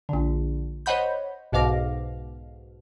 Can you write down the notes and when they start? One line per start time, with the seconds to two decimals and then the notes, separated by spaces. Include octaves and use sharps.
0.09 A#1 D3
0.86 C5 C#5 D#5 F#5 B5 G6
1.52 B1 G#2 B2 F5 D6 A#6